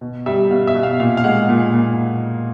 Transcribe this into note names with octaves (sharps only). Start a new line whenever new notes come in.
B2
G3 E5
B2 F5
E5
B2
F5
A#2 F5
F5
G#3 F#5
A#2
A#2